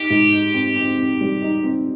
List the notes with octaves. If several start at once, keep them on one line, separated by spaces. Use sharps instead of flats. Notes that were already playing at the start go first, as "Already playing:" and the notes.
Already playing: D#4 G4
G#2
D#4
C4
C4
C4
G3
D#4
C4